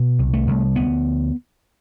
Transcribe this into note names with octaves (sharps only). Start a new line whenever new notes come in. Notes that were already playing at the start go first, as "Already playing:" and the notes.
Already playing: B2
C2
A3
C2
D2 B3